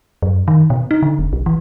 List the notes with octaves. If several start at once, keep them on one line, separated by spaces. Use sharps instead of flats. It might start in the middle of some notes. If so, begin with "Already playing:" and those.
F#2
D#3
B2
D#4
D3
E1
B1
E3